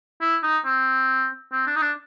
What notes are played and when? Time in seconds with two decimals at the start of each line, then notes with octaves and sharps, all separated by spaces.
0.21 E4
0.43 D#4
0.65 C4
1.53 C4
1.67 D4
1.76 D#4
1.82 D4